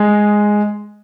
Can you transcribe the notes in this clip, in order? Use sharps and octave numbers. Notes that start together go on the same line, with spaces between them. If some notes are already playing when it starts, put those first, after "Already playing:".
Already playing: G#3